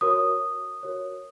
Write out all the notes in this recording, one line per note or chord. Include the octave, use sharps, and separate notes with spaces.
F#4 A#4 C#5 D#6
F#4 A#4 C#5